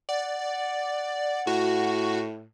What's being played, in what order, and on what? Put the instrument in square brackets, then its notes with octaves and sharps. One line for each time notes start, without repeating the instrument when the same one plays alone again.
[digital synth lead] D5 [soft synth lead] F#5
[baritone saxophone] A2 [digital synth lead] F#4